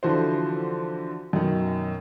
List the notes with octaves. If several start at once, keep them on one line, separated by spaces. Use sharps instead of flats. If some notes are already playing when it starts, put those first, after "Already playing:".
D3 E3 F3 F#4 C5
F#2 B2 D#3